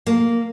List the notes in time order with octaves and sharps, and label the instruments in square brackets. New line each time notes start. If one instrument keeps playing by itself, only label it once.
[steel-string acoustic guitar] A#3